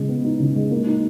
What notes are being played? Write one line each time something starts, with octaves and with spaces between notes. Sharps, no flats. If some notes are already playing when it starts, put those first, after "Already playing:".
Already playing: C#3 G#3
B3
D#4
C#3
G#3
A#3
D#4